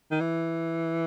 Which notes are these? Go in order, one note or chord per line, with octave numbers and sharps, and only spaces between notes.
D#3
E3